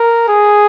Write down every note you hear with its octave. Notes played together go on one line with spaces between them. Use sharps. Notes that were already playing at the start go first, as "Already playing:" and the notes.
Already playing: A#4
G#4